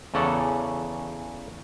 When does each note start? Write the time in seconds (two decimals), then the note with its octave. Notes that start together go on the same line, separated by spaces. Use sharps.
0.14 E2 C#3 C#4 A4 D5 F#5